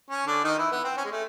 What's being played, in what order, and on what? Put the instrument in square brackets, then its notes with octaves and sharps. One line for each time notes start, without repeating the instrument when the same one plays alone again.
[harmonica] C#4
D3 D4
D#3 D#4
E3 E4
B3
C4
C#4
G#3
A3